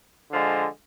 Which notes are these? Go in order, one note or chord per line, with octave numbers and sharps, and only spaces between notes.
D3 F3 G#3